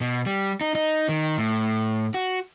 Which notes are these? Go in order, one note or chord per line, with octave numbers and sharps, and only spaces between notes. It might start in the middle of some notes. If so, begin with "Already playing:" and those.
B2
G3
D#4
D#4
D#3
A2
F#4